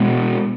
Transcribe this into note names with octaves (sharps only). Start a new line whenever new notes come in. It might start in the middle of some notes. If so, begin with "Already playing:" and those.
Already playing: B2 G#3 B3